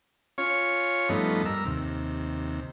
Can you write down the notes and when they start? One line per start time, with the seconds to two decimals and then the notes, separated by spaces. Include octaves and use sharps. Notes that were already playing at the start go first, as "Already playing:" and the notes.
0.38 C#4 F4 C#5 C#6
1.09 G2 F3 A3 B3 D#4
1.45 G2 A#4 E6
1.65 D#2 C3